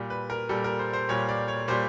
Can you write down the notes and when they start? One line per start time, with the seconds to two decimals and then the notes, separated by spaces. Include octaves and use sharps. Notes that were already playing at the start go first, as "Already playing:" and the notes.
Already playing: A#2 G3
0.10 B4
0.30 A#4
0.49 A#2 G3 A4
0.64 A#4
0.79 C5
0.93 C5
1.09 A#2 G3 C#5
1.29 D5
1.48 C#5
1.68 A#2 G3 C5